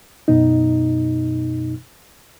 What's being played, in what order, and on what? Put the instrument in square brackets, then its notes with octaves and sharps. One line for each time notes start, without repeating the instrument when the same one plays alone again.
[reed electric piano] F#2 B2 D#4